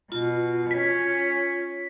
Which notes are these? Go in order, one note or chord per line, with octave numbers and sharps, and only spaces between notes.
B2 F4
C#4 C#5 B6